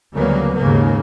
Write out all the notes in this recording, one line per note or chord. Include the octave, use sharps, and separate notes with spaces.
D2 C#3 F#3 G3 A#3 B3
D#2 G#2 C#3 F#3 A#3